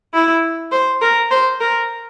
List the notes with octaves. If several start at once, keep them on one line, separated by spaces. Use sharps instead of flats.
E4
C5
A#4
C5
A#4